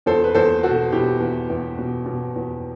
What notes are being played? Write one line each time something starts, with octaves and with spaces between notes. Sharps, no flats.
E2 A4 C5
B4
E2 A4 C5
B2 F#4 A4
B2 E4 G4
E2
E2
B2
B2
E2